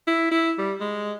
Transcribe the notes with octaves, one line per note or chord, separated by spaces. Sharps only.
E4
E4
G3
G#3